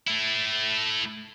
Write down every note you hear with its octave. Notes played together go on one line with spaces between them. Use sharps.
A3 E4